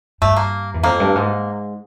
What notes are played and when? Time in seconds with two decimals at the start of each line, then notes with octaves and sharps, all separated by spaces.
0.21 G2 A3
0.36 A#3
0.74 E2
0.83 F2 A#3
1.00 G2
1.15 G#2